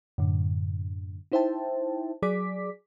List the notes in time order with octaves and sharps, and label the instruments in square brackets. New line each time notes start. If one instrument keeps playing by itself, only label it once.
[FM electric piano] F#2 A2 D3
D#4 E4 C5 E5 G5 A5
F#3 G#4 D5 D6 B6